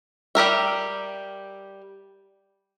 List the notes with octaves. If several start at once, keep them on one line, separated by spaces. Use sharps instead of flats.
G3 G4 A#4 E5